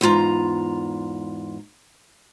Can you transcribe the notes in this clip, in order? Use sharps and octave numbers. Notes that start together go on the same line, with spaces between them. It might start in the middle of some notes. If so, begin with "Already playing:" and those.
E2 G#2 F4 A#5